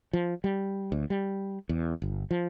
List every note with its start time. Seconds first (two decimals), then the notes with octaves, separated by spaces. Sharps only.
0.13 F3
0.44 G3
0.92 D2
1.10 G3
1.69 E2
2.02 G1
2.31 F3